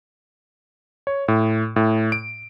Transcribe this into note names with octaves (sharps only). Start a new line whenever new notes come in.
C#5
A2
A2
D7